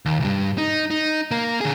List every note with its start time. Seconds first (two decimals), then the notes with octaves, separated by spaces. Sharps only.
0.06 D#2
0.20 C2 G2
0.58 D#4
0.91 D#4
1.31 A#3 A#4
1.61 D3 G#4